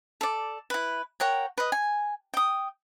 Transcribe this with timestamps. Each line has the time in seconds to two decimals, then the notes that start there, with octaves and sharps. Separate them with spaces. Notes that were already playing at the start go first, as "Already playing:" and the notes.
0.21 A4 D5
0.70 E4 B4
1.20 A#4 C#5 F#5 G5
1.58 B4 D#5
1.72 G#5
2.34 G5 D#6